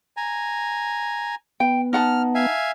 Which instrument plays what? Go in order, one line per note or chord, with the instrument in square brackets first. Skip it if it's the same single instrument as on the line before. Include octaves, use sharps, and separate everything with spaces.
[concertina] G#5 A#5
[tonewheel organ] B3 [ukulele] G5
[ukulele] D#4 F#5 A5 [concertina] F6
[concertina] E5 F5 G#5